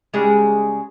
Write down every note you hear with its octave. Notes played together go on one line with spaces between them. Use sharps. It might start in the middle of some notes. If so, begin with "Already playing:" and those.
C#3 G3 G#3